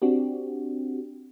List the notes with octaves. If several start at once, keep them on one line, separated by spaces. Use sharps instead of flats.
C4 D4 F#4 G4